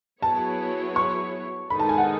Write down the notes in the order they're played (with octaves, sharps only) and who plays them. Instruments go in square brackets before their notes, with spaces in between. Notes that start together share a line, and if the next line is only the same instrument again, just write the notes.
[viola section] F#3 B3 E4 G#4 C#5 [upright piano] A5
[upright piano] C#6
[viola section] D#3 G#3 D#4 A4 [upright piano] B5
[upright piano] A5
G#5
F#5